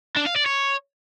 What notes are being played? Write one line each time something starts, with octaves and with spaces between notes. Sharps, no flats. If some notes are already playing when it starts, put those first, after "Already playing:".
D4
F5
D5
C#5